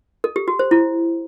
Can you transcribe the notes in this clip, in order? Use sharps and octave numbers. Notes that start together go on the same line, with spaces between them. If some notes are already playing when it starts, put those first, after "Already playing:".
A4
G4
F#4
C5
E4